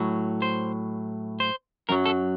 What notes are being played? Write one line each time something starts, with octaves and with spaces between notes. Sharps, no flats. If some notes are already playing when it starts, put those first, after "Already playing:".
Already playing: A2 F#3
C5
C5
F#2 F#3 A#4
A4